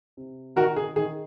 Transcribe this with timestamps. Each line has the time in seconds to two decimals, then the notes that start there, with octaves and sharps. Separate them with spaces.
0.17 C3
0.56 D#3 F#4 A#4
0.76 G#4
0.96 D#3 G#4